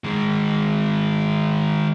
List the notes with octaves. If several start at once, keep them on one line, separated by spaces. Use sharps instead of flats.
D#3 G#3